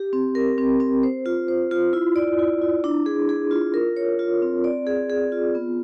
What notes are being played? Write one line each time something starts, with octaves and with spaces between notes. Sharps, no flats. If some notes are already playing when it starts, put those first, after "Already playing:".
Already playing: G4
C4
A#4
C4
C4
C5
F4
C5
F4
E4
D5
E4
E4
D4
G#4
G#4
F4
A#4
C#5
F4
C4
D5
G#4
G#4
F4
B3